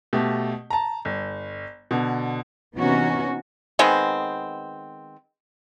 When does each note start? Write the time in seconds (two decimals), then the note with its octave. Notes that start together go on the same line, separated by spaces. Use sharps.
0.13 B2 A3 G4
0.71 A5 A#5
1.05 G1
1.91 B2 D3
2.75 C3 E3 B3 C#4 D#4 F#4
3.79 D#3 G#3 B3 C4